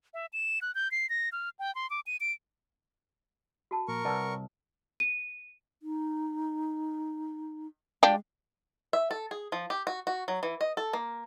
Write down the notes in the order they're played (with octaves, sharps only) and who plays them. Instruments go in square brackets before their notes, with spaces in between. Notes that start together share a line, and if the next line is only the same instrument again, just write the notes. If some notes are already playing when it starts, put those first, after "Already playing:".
[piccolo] E5
E7
F#6
G6
C7
A#6
F6
G5
C6
D6
D#7
D7
[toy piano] F#4 A5
[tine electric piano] A#2 F3 A#3 [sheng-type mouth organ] A#4 C#6
[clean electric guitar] C2 [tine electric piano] B4 D5 F#5 [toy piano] A5
[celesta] D#7
[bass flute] D#4
[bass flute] G#3 [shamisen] D4 F4 G4
[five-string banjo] E5
A4
G#4
F3
G4
F#4
F#4
F#3
E3
D#5
A4
A#3